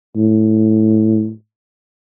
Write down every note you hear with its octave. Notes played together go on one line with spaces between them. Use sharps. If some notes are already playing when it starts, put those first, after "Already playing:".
A2